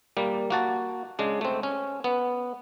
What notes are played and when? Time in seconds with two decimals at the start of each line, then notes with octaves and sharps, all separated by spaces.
0.17 G3 A#3
0.50 A#3 F#4 A5
1.19 C#3 G#3 D4
1.41 A3 C4
1.63 C#4
2.04 B3